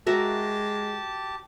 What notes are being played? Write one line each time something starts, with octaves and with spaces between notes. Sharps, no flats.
G#3 F#4 G4 A#4 E5 A5